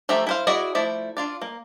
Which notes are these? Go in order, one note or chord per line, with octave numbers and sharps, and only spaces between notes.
F3 A3 G4 E5 A#5
E4 C5 F5
E4 F#4 G#4 D5 D#5
F3 A3 E4 D5
D4 F4 D5
A#3